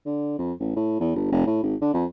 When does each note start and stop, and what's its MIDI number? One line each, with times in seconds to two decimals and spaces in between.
0.06 0.36 50
0.39 0.52 41
0.60 0.72 33
0.76 0.99 45
1.00 1.11 40
1.15 1.28 31
1.31 1.46 29
1.47 1.60 45
1.63 1.75 32
1.81 1.92 50
1.94 2.05 41